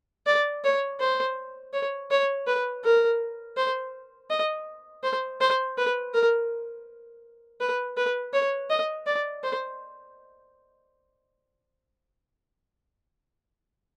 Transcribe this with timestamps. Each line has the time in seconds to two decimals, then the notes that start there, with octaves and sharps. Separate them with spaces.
0.26 D5
0.64 C#5
1.00 C5
1.73 C#5
2.11 C#5
2.47 B4
2.84 A#4
3.57 C5
4.30 D#5
5.03 C5
5.41 C5
5.77 B4
6.13 A#4
7.60 B4
7.97 B4
8.33 C#5
8.70 D#5
9.06 D5
9.43 C5